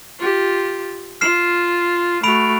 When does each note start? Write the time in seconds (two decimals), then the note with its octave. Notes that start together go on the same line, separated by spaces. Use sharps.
0.19 F4 G4
1.21 F4 F6 C7 E7
2.23 A3 F#4 B5 D7 F7